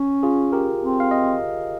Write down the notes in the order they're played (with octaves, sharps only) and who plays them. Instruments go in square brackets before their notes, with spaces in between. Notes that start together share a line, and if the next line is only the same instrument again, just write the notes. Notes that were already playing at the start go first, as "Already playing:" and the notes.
Already playing: [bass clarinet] C#4
[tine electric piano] F4 G#4
G4 A#4
[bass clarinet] C4
[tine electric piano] F5
D#5